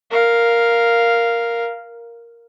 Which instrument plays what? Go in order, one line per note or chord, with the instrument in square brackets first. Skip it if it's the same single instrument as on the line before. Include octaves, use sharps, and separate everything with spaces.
[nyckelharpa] A#4 F5